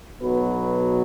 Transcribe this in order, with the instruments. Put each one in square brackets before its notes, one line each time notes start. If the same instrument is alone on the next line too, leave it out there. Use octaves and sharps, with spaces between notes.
[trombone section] B1 B2 F#3 B3 B4